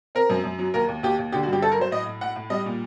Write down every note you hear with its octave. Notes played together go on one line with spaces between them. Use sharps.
C4 A#4
F#2
F#2
F#3
D#2 A#4
D#2
D#2 G4
D#2
D3 G4
F#4
G2
G4
A3 A4
A#4
F#3 C5
A2 D#5
A2
A2 F#5
A2
G3 D#5
A#2